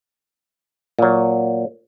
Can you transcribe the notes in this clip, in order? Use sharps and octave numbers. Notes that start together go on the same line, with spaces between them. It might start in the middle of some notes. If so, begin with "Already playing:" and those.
A#2 F#3